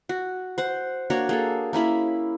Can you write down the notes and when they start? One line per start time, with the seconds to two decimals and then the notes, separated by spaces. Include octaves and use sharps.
0.09 F#4
0.58 C5 F#5
1.10 A#3 D4 F#4 C#5
1.29 A#3 G#4 A4
1.73 A#3 C#4 E4 B5